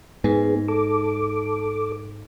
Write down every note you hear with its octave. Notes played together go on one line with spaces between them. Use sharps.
G#2 B3 G#4
A4 D6